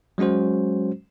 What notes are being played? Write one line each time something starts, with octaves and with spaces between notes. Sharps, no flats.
F#3 G#3 C#4 F#4 C5